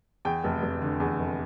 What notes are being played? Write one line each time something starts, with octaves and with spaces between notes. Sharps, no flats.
E2 G5
F1
F1
D3
E2
F1